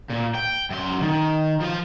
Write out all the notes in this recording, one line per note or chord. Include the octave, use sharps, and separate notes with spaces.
A#2
G5
F#2 C6
D#3
F3 F5